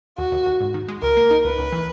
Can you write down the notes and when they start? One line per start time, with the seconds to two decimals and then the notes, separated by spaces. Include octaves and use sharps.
0.18 D#2 F#4
0.32 D#2
0.46 D#2
0.60 G#2
0.74 D#3
0.88 G#3
1.02 C#2 A#4
1.17 A#3
1.31 D#4
1.44 C#2 B4
1.59 C#2
1.72 E3